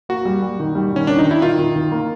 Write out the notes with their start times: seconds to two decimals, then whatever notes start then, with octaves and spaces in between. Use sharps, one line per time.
0.09 A#3 F#4
0.25 G3
0.42 G3
0.60 D#3
0.75 G3
0.93 D#3 C#4
1.07 D#3 D4
1.18 D#4
1.25 D#3
1.31 E4
1.42 D#3 F4
1.59 D#3
1.76 D#3
1.92 A#3